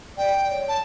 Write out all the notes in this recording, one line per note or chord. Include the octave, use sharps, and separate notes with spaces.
D5 G5
C#5
A5